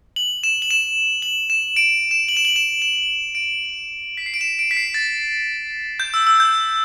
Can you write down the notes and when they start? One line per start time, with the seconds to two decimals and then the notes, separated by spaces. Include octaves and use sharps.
0.16 F#7
0.43 E7
0.62 F#7
0.71 E7
1.22 F#7
1.50 E7
1.77 D7
2.11 E7
2.29 F#7
2.37 E7
2.45 F#7
2.56 E7
2.82 E7
3.35 D7
4.17 B6
4.26 C7
4.34 D7
4.41 E7
4.59 D7
4.71 B6
4.77 C7
4.94 A6
6.00 G6
6.14 E6
6.27 E6
6.40 G6